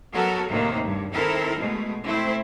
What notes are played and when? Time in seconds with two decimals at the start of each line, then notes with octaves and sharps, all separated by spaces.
0.13 F#3 B3 F#4 A4 A#4
0.49 D#2 A2 C3 D#3 A#3
0.82 G2
1.13 D#3 C4 E4 A4 A#4
1.58 B2 G#3 A3
2.05 A3 C4 E4